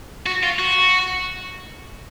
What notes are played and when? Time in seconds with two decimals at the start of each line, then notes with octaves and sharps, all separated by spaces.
0.26 F#4
0.43 F4
0.59 F#4